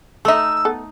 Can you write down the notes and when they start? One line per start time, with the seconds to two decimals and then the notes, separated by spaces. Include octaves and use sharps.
0.25 A3 D#4 A4 E5 E6
0.65 B3 A4